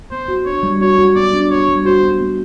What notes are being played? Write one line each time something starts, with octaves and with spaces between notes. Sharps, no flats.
B3 C5
F#4
D4 C#5
G3
F#4 C#5
F#4
B3 D5
D4
F#4 C#5
G3
F#4 C5
B3
B3